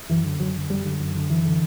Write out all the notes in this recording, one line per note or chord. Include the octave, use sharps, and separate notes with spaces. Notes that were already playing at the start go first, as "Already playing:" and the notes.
F#2 E3
D3
F#2 F#3
D3
F#2 G3
D3
F#2
D3
F#2 E3
D3